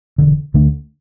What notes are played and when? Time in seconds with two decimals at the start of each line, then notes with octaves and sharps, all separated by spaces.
0.18 E1 E2 D3
0.54 D2 D3 A3 D4